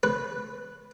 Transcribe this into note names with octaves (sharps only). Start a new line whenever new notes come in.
B4